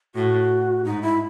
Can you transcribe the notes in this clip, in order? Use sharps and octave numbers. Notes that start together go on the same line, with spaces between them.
A2 F#4
G#2 D#4
E4